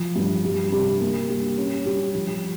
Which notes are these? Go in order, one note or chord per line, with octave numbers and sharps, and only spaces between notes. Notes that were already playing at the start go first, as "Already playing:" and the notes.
Already playing: F3
G2
G3
C3
A#3
G3
C#4
G3
F3